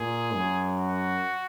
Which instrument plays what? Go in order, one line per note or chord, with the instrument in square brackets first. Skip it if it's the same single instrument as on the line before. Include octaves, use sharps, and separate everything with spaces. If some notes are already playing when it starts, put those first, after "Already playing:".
Already playing: [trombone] A#2 [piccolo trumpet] G#4
[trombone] F#2
[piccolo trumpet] F#4